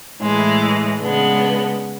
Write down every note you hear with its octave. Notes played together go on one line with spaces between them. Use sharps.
A2 E3 G#3
C#3 G#3 B3 D4